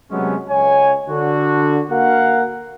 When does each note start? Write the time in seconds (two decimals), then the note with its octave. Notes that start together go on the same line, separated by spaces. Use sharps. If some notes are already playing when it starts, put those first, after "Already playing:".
0.11 C3 F#3 G#3 A3 B3 C#4
0.50 C#2 C#5 G#5
1.09 D3 F#4
1.90 A#3 F#4 A#4 F5 F#5